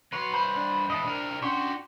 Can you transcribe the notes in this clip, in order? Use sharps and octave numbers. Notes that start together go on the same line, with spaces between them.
F#3 B4 C#5 C6
G2 C5 B5
D4
E3 G#3 D#5 A5
C3 D4 A#4
C#4 D4 F#4 G4 C6 C#6